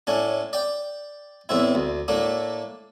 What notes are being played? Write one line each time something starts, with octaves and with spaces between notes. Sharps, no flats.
A2 C#4 D4
D5 G5
E2 A2 C4 E4
D2
A2 A3 A#3 D4